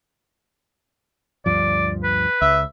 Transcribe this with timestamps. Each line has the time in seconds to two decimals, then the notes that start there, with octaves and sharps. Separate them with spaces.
1.46 D2 G2 F3 D5
2.04 B4
2.41 C#2 E5